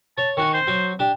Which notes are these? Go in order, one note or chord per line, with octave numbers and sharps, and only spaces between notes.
C#5 A5
D#3 F#4 G#5 C#6
C5
F#3 C#6
D4 G4